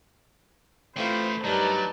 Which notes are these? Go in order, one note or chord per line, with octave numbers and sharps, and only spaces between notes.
A2 E3 A3 C4 E4 F4 C5 B5
G2 F#3 D#4 A#4 B4 D5 A5